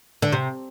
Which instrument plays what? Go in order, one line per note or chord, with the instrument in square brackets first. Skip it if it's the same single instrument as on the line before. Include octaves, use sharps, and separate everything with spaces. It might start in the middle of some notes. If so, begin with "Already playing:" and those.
[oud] D3
C3